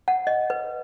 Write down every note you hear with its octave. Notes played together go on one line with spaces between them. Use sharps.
F#5
D#5
B4